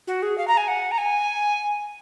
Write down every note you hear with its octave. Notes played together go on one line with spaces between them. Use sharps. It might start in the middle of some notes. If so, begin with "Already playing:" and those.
F#4
G#4
F5
A#5
G#5
F#5
A#5
G#5